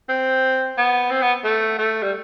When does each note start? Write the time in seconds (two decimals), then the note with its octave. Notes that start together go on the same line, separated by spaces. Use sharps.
0.09 C4
0.77 B3
1.11 C4
1.23 B3
1.44 A3
1.79 A3
2.03 G3